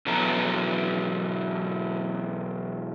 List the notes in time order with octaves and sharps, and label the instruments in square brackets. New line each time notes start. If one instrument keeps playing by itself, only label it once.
[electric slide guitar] B2 E3 F#3 B3 A4 A#5